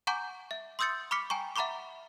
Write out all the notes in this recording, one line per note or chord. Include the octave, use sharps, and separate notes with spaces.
F#5 G#5 A#5 C#6 D6 G6
E5
C6 D#6 E6 G6 A6 C#7
B5 C#6 D6 F6 B6 C#7
G5 G#5 A#5 C#6
E5 F#5 A#5 B5 C#6 D6